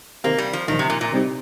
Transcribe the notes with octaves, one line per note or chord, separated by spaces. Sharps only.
C3 D#3 A#3 C4 G4
G3
F3
C2 A#2 D#3 F3
C3
A#2
A#2
C3 G3 C4 D#4 G4